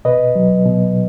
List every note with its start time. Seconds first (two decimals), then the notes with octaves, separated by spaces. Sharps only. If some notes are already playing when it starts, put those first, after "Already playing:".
0.05 B2 B4 D#5
0.36 F#3
0.66 B2